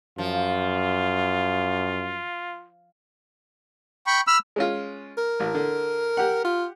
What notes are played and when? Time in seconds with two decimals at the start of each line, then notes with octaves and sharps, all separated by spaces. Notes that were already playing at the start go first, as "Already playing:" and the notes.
0.18 F#2 F3 F4
4.07 G5 B5 C#6
4.27 B5 E6 F6
4.56 G#3 C#4 F4
5.18 A#4
5.40 A1
5.55 D3
6.17 G4 F#5
6.45 F4